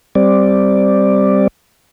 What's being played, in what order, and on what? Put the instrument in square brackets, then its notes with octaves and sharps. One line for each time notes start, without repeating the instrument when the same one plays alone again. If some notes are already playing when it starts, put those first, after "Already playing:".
[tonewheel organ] G3 C4 D5